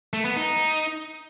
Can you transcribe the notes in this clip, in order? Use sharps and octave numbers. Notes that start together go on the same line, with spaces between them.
A3
B3
D#4